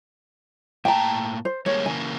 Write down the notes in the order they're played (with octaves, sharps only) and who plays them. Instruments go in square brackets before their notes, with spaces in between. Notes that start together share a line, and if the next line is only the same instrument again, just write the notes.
[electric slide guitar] A2 A#3 A5 [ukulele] G5 A#5
[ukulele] C5
[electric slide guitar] G3 G#3 A#3 [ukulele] C#5
[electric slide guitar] C#3 E3 A#3 [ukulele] G#5